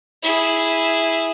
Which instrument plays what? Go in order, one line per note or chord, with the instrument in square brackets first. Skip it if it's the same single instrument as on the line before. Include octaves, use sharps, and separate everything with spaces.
[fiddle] E4 G#4